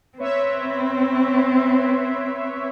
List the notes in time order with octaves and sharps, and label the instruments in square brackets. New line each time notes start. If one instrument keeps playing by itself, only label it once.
[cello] C4 [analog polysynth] B4 C#5 E5